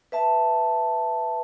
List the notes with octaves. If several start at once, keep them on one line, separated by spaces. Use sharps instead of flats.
B4 E5 A5